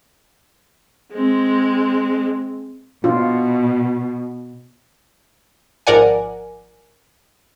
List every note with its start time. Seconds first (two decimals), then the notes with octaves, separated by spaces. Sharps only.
1.13 G#3 C4
3.04 B2 D4 F4
5.87 G#1 F3 A#4 D5 F#5 G#5